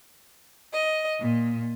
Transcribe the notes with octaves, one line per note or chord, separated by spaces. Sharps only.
D#5
A#2